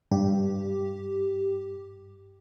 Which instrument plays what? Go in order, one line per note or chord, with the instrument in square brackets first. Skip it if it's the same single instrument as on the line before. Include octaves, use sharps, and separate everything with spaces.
[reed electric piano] G2 [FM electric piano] G4